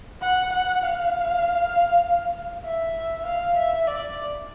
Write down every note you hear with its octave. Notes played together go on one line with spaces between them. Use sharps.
F#5
F#5
F5
E5
F5
E5
D5